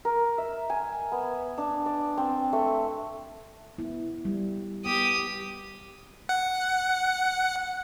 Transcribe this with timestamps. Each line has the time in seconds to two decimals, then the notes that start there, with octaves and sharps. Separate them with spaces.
0.05 A#4
0.38 E5
0.70 G#5
1.12 B3
1.58 D4
1.86 D5
2.17 C4
2.53 A3
3.78 B3 E4
4.25 G3
4.86 B3 G4 D#6
6.29 F#5